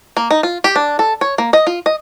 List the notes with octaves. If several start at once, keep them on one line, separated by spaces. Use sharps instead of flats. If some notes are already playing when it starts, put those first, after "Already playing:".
A#3
D#4
F4
G4
D4
A4
C#5
A#3
D#5
F4
D#5